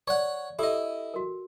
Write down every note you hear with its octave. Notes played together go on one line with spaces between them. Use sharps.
C#5 D5 F#5 C#6
E4 G4 A4 D#5
F#4 A#4